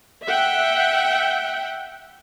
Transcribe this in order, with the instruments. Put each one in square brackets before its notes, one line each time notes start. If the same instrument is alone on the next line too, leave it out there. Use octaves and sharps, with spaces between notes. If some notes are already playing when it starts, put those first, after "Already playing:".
[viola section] E5 F#5 G5